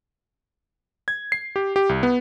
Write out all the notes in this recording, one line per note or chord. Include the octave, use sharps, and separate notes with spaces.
G#6
C7
G4
G4
C2
B3